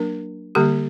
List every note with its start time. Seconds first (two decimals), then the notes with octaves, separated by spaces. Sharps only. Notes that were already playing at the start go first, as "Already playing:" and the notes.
Already playing: F#3 A#3 D4 A#4
0.55 D3 G3 A#3 G4